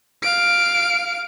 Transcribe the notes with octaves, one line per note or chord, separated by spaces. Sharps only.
F5 D7